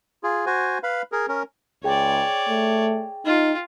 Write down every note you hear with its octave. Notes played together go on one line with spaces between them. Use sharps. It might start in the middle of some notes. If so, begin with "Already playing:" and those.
F4 G#4
F#4 C5 G#5
B4 F5 B5
G#4 A#4
C#4 A#4
C#2 G#4 C#5 D5 G5
A3
D#4 F4